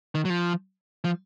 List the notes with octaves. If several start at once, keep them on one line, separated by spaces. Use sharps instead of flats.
D#3
F#3
F3
F3